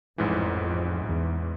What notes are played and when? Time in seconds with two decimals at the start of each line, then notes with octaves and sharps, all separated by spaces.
0.18 A1 F2 G#2 E3
1.05 E2